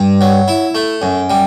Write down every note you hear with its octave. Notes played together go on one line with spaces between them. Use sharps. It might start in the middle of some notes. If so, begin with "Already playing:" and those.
Already playing: G2
F#3
E4
A3
F#2
G3